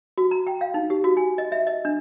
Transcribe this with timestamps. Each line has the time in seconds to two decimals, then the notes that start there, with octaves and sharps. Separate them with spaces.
0.18 F#4
0.31 A#5
0.47 G5
0.61 F5
0.74 D#4
0.90 G4
1.04 F#4
1.17 G#5
1.38 D#5
1.52 E5
1.67 D#5
1.85 D4